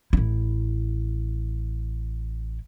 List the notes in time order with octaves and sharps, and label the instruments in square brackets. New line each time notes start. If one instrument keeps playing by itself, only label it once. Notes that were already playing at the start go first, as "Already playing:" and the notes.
[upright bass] A1 E4